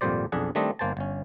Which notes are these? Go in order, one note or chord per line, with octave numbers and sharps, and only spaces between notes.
G#1 F2 A#2 G3 C5 D5
B1 F2 D4 G#4 F#5
D#3 G3 A3 C4 D4 D#5
G1 A#3 C5 G#5 A5
G1 C#4